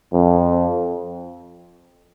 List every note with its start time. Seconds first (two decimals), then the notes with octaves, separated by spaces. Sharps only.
0.13 F2